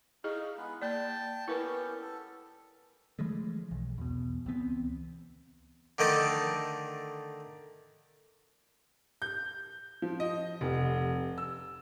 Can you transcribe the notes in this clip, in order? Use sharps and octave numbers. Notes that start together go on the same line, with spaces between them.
D#4 E4 G#4 D#5 F5
G#3 B3 B4
A#3 D5 G5 A5
B3 C#4 E4 G4 A#4 B4
A4
E3 F3 G#3 A3
B1
E2 B2
C#2 E3 B3 C4
D3 D#3 A3 D#5 G5 A5
G6
F3
D#5
F1
E6